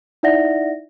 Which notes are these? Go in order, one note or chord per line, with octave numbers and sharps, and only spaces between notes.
D#4 E4 D5 E5 F#5 A#6